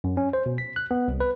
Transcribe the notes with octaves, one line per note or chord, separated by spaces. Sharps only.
F#2
C#4
C5
B2
B6
F#6
B3
C2
B4